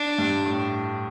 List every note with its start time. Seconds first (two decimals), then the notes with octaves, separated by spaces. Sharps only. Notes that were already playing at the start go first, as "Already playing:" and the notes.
Already playing: D4
0.18 G2
0.46 A2